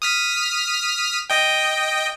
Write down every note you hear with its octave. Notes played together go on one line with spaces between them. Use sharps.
D#6 F6 B6
D#5 G5